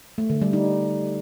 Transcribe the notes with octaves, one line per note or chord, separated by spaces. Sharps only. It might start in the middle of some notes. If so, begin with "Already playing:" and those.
A3
D3
G3
D#4